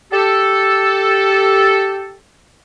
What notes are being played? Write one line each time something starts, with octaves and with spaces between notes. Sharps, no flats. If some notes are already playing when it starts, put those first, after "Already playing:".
G4 A4